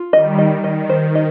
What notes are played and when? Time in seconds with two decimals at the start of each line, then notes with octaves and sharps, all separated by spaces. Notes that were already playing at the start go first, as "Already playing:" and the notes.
Already playing: F4
0.12 D#3 G3 D#5
0.39 D#5
0.64 D#3 D#5
0.89 C5
1.15 D#5